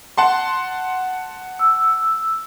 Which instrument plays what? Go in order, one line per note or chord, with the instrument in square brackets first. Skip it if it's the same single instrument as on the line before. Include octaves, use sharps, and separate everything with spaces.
[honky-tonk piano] F#5 A5 C6
[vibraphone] E6